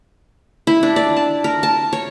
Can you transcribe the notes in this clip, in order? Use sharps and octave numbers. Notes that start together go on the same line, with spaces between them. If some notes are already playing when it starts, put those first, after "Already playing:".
E4
D4
D5
A5
A#4
A5
C#5